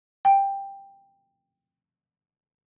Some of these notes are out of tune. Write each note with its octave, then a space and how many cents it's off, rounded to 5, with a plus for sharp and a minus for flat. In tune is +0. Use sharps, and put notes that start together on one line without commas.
G5 +10